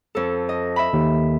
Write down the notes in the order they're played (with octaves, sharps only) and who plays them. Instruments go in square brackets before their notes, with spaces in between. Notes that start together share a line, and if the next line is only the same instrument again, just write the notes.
[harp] F2 A4
D#5
E5 B5
[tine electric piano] D#2